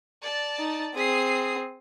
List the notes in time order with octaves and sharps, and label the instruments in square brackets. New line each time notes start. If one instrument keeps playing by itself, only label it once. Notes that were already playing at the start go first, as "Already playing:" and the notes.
[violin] D5 A5
[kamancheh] D#4
[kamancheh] C4 G#4 [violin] D#6 C7